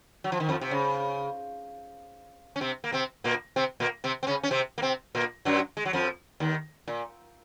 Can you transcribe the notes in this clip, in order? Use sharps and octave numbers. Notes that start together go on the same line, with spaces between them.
F#3
F3
D#3
F2 F3
C3
C#3
C#4
C3 C4
A#3
C3 C4
A#2 A#3
C3 C4
A#2 A#3
C3 C4
C4
C#3 C#4
C#4
C3 C4
A#3
C3 C4
A#2 A#3
F#2 F#3
G#3
F#3
F2 F3
D#2 D#3
A#2